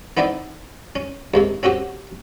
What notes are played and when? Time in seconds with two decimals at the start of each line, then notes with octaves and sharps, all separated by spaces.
0.17 B3 C4 D#4 E4 D5
0.96 C#4
1.34 D#2 G#2 C3
1.63 C4 C#4 F#4 G4